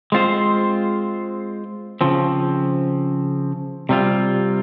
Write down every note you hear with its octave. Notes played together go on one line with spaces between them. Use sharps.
G#3 C4 F4 C5
C#3 F3 C4
C3 G3 C4 F4